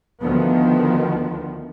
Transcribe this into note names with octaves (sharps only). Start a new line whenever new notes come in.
D2 D#3 F3 B3